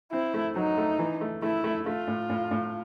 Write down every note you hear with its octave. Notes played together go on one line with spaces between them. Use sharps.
C4 E4
A3
F#3 D#4
A3
E3
A3
A3 E4
A3
A3 F4
A2
A2
A2